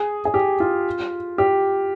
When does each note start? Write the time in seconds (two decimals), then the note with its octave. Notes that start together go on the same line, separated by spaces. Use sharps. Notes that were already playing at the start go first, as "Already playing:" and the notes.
Already playing: G#4
0.25 G#4
0.34 G4
0.60 F4
1.38 G4